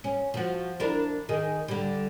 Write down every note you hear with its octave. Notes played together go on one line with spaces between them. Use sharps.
C#4
F3 F#4
D4 E4 A#4
D#3 G#4
D3 G3